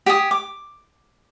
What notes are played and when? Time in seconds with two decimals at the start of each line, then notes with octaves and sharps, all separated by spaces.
0.06 G4 G#5 D#6
0.31 D6